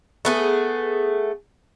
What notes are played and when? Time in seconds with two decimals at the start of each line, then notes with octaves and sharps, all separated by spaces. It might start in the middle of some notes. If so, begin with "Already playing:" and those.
0.25 A3 B3 G#4